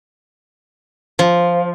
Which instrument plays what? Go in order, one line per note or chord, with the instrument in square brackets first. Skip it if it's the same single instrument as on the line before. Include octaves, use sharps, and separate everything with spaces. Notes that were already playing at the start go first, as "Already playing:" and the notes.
[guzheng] F3